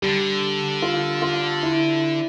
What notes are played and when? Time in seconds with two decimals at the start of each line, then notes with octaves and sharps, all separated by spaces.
0.02 D3 G3
0.82 F4
1.22 F4
1.63 E4